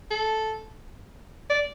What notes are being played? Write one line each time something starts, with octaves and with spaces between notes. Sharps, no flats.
A4
D5